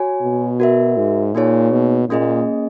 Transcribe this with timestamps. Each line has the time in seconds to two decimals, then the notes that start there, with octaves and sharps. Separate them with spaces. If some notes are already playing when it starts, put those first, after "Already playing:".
Already playing: F#4 C#5 G#5
0.22 B2
0.60 F#4 A#4 E5
0.97 G#2
1.35 A#2 A#3 D#4 G#4 C#5
1.72 B2
2.09 A#2 A#3 C#4 G#4 D#5